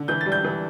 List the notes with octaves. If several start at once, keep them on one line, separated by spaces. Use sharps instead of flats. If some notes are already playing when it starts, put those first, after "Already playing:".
Already playing: D3
E3 G6
A6
G3
G6
E3